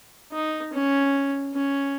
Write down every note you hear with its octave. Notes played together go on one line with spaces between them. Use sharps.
D#4
C#4
C#4